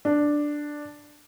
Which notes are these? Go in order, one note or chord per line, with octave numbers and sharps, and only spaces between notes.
D4